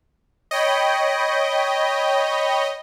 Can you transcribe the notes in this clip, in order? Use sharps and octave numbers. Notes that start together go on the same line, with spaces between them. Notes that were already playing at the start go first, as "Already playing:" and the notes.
C#5 D#5 G5 B5